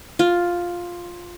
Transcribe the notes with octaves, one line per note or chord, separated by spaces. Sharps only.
F4